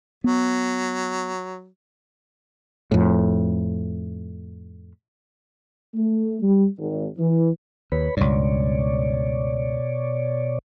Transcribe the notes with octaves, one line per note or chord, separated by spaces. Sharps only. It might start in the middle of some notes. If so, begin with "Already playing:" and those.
F#3 B3
F2 A2
A3
G3
G#1
E3
D#2 B4 C#5 B5
C#2 G2 B2 C#5 D5